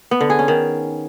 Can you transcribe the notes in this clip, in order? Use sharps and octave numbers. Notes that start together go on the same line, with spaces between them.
B3
D3
G#4
C#4
D#3